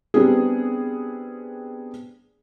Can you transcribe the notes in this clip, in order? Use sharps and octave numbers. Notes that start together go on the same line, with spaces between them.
G3 B3 C4 D4 G#4